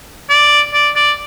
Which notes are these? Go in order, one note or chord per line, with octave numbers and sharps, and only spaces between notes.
D5
D5
D5